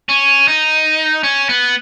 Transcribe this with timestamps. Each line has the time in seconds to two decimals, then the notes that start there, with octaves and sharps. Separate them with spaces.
0.09 C#4
0.48 D#4
1.23 C#4
1.49 B3